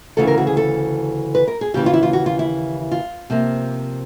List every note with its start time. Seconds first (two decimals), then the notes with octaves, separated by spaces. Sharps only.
0.17 D2 C#3 E3 A4
0.27 A#4
0.38 F#4
0.47 G#4
0.57 A4
1.35 B4
1.48 A#4
1.61 G#4
1.74 D#2 C#3 E3 G4
1.86 F4
1.93 E4
2.03 F4
2.13 F#4
2.26 F4
2.39 E4
2.91 F4
3.30 C3 F3 A#3